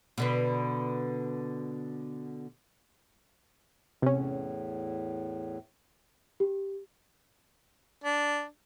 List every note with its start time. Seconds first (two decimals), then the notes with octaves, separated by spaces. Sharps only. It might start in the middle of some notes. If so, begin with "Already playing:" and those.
0.18 B2 D3 B4
4.02 E2 A2 C3 C#4
6.40 G4
8.04 D4